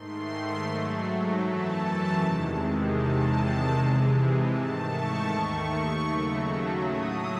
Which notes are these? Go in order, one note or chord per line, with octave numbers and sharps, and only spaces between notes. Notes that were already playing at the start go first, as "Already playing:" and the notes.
Already playing: G#2 D#3 A3 C6
G#2 F#3 A3
F#2 E3 A3 A5
E2 C3 D#3 G#3
E2 C3 D#3 G#3 A5
C3 E3 G#3
G#2 D#3 A3 A5
C#6
D#2 D#3 A3 C#6
D#2 C#3 F#3 A3
A2 F#3 A3 D#6